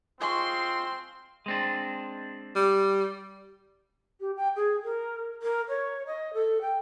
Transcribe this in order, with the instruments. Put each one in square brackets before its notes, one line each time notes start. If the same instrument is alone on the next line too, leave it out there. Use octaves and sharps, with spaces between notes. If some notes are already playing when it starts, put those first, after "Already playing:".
[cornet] C4 [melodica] F4 [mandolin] G#4 D#5 C#6 [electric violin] C6
[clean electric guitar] G#3 C4 D4
[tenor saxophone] G3
[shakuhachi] G4
G5
G#4
A#4
A#4
C#5
D#5
A4
G5